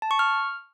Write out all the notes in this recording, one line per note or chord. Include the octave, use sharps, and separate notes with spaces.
A5
C#6
F6